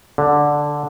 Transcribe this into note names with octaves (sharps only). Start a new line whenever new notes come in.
D3